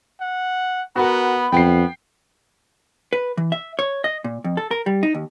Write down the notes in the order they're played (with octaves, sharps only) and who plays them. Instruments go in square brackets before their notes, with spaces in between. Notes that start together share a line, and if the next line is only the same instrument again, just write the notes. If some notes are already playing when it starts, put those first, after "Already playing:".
[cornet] F#5
[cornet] B3 [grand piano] F#4 A#4 [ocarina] B5
[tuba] F2 [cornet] B3 [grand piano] G5 C7
[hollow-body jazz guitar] B4
E3
E5
C#5
D#5
A#2
F2
A4
A#4
G3
D#4
D#2